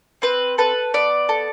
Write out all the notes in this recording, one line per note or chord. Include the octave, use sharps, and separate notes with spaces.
C4 B4
A4 B4
B3 D5
A4